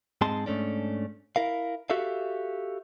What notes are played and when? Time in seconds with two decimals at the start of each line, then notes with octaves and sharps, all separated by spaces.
0.21 G#2 G#3 C4 D#5 A5 C6
0.46 G#2 A3 C#4 D4
1.36 E4 A#4 F5
1.90 F#4 G4 A4 E5 F5